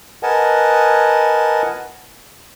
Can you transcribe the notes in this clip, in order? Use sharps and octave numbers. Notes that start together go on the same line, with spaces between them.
A#4 B4 D#5 F#5 G#5 A5